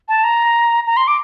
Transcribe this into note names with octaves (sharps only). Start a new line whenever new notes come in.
A5
A#5
A#5
C6
D6